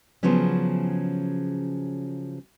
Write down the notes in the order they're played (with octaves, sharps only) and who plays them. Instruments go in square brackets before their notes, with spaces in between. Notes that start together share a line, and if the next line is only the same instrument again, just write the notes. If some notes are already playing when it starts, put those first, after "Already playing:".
[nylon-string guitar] C#3 F3 F#3 B3 C#4